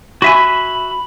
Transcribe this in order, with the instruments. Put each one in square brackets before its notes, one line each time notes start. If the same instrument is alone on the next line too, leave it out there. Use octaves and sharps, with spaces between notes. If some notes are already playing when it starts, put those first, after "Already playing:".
[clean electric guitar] F#4 E5 G#5 [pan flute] B5